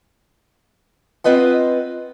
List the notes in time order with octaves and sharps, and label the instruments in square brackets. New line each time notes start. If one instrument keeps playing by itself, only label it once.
[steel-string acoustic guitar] C4 F4 B4 D#5 F#5